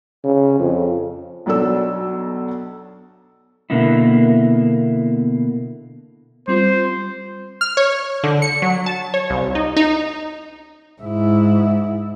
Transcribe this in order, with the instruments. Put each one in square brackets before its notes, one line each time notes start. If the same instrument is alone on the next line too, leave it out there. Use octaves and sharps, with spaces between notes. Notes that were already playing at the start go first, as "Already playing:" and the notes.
[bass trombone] C#3
F2
[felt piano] B1 F#3 D4 A4 E6
[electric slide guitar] B2 D3 A#3 B3 E4
[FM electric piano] G3 C4 F4 [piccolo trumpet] C5
[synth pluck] F6
C#5
D3
C#7
F#3
A5
C#5
C2
D#4
D#4
[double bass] G#2 E4